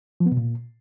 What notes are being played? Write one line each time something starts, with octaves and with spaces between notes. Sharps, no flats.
F3
B3
B2
A#2